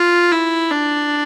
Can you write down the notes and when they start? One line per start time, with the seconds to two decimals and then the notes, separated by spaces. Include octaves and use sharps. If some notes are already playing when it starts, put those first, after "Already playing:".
Already playing: F4
0.32 E4
0.71 D4